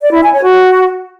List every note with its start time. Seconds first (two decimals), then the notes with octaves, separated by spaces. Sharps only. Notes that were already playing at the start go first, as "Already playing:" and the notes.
0.01 D5
0.12 E4
0.23 G#5
0.33 C#5
0.44 F#4